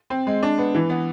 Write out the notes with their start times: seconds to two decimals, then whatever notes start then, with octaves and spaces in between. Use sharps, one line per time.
0.10 C4
0.27 G#3
0.43 D4
0.58 B3
0.75 E3
0.90 B3